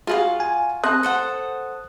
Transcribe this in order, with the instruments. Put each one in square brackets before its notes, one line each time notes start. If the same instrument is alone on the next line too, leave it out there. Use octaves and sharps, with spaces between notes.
[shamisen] G#3 G#4 [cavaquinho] F4 F#4 F5
[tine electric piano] G#5
[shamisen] C4 A5 [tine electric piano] D#6 F#6
[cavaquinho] A4 C5 F#5